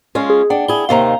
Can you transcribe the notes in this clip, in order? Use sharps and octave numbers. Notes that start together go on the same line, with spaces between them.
G#3 C#4 F4
G#4
D4 F#5 G5
E4 G#4 G7
D#2 C3 D#3 F5 A#5